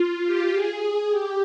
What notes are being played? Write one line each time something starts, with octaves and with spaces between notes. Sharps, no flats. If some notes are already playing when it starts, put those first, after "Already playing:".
Already playing: F4
G4
G#4
G4